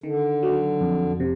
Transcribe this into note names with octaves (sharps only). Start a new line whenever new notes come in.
D3 D#3
F#3
F2
C3